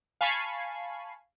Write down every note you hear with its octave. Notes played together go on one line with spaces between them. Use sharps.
F5 G#5 A5 B5 C#6 C7